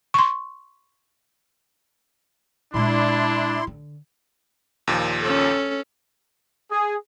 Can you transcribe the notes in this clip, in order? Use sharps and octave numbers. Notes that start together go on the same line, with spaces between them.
C6 C#6
A#2 G#3 D4 E4 C6
D3
D#2 A#2 F3
C#4 A4
G#4